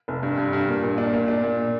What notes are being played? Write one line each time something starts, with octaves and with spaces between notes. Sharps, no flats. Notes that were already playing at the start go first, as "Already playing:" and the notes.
F1
G2
G2
G2
A#2
A#2
D4
A#2
D4
A#2